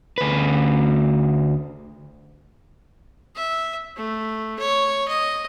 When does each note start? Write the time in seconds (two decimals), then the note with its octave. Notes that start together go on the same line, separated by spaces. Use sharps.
0.18 D2 B4
3.35 E5
3.97 A3
4.59 C#5
5.08 D#5